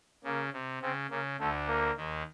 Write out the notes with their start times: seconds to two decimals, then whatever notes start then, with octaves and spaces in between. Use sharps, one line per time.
0.24 C#3 A#3
0.53 C3
0.82 C#3 C4
1.10 C#3 A#3
1.39 D2 D3 A3
1.67 A#3
1.97 D#2 D#3